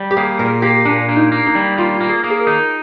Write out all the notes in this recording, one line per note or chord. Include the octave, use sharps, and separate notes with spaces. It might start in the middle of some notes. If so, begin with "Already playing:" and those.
Already playing: G3
G4
A#3 G#4
A#2 A#4
A#3 G4
A#2 D4
A#3
D#4
A#3
D#4
G3
A#3 F4
A#3
G#4
A#3
G#4
A#4
D#4